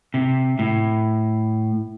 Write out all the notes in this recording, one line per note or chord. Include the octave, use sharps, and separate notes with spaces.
C3
A2